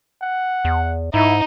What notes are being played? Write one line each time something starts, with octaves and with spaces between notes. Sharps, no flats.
F#5
E2
G#2 D#4 E4